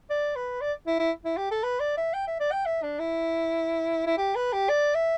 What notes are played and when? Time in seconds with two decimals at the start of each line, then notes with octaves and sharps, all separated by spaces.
0.10 D5
0.36 B4
0.61 D5
0.87 E4
1.00 E4
1.25 E4
1.38 G4
1.51 A4
1.63 B4
1.80 D5
1.98 E5
2.14 G5
2.27 E5
2.40 D5
2.52 G5
2.66 E5
2.83 D4
3.00 E4
4.07 E4
4.18 G4
4.36 B4
4.53 G4
4.69 D5
4.95 E5